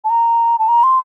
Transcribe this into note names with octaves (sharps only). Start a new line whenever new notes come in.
A5
A#5
A5
A#5
C6